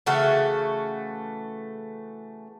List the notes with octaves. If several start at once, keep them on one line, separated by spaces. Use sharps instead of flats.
C#3 E3 A3 F#4